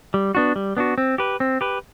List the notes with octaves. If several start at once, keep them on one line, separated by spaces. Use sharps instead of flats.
G3
B3 D4 F#4
G3
B3 D4 F#4
C4
G4 B4
C4
G4 B4